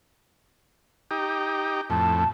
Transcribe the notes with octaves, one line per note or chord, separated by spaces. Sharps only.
D#4 G4
F2 A2 A5